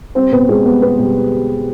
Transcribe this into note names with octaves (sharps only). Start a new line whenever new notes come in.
G3 C4 C5
B2 B3 B4
B2 G#3 G#4
G3 B3 B4
G3 B3 B4
B2 G3 G4